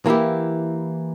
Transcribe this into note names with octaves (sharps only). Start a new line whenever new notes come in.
E3 A#3 E4 G4